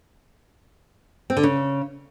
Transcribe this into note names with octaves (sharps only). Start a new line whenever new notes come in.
C4
D3
C#3